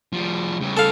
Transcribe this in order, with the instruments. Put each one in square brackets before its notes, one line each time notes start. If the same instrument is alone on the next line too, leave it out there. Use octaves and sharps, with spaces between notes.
[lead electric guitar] F3 G3
C#3 G3
[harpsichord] A4 F5